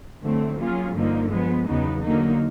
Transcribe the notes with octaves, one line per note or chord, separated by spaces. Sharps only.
F2 D3 F#3 A3 C4
F#3 A#3 C#4 F4 G#4
G2 D3 F3 A#3 D#4
F3 G#3 B3
E2 C#3 F#3 B3 D#4
D3 F#3 A#3 D#4